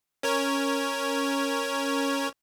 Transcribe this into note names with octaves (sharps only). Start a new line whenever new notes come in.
C#4 A#4 C#5